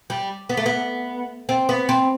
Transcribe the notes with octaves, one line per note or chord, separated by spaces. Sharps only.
G3
B3
A3
B3
C4
B3
C4